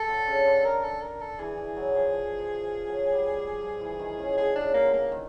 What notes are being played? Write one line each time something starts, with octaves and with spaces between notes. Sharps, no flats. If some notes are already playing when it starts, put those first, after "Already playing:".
Already playing: A4
D3
C#3
D3
A#4
A4
A#4
A4
E3 G#4
E3
F#3
F3
F3
F3
F3
F#3
G3
G3
F3
E3
D#3
C#3
D3 G#4
D4
C#3
A#3
D3
A#3
D#3